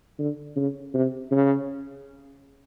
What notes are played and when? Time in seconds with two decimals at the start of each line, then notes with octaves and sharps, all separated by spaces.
0.19 D3
0.56 C#3
0.94 C3
1.31 C#3